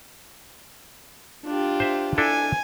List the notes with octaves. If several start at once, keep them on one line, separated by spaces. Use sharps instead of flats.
D4 F4 G4
C5 E5
D4 E4 A4 G#5